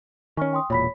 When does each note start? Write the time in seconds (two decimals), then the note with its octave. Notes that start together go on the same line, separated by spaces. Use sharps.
0.37 D#3 C#4 G#5 C#6 F6
0.53 G5 C6 D#6
0.70 E1 A#2 C#5 B5 B6